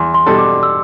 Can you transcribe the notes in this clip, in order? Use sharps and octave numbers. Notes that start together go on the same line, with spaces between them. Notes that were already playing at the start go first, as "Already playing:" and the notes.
Already playing: E2 C6
C6
B2 G3 D4 A4
D6
E6